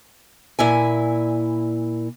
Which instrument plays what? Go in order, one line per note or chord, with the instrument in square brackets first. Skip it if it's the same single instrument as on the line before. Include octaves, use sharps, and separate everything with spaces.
[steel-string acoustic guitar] A#2 E4 G#5